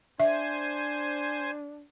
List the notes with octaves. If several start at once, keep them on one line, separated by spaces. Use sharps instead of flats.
D4 C5 E5 G#5